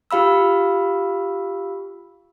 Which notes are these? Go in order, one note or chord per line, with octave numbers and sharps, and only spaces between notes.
F4 G4 F5 B5 E6